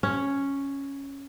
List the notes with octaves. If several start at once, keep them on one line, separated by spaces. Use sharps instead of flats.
C#4